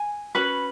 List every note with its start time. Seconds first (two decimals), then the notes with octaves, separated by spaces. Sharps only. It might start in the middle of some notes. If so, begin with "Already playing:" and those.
Already playing: G#5
0.35 C#4 F#4 B4 B5